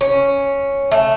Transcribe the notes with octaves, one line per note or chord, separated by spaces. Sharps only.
C#4
A3